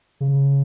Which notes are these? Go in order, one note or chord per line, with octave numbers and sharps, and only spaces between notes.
C#3